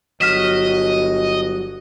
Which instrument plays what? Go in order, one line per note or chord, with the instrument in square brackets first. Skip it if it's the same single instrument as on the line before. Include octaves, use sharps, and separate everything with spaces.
[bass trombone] G1 [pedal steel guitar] F#3 F#4 [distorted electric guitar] D#5 [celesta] F6 B6 E7